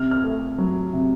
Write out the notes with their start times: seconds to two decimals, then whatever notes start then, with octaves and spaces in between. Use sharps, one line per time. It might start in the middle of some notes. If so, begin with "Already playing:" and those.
Already playing: C3 F6
0.11 F6
0.24 A3
0.58 F#3
0.93 C3